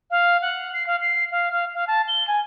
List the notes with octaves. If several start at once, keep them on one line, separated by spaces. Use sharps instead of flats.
F5
F#5
C7
F5
C7
F5
F5
F5
A5
G7
G#5